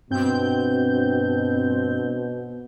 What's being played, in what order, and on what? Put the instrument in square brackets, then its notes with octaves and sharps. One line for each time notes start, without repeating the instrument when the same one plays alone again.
[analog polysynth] G2 C4 G6 [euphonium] B2